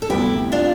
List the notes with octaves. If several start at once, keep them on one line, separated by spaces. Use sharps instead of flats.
A4
D2 C3 G3 B3 E4 G4
D4 F4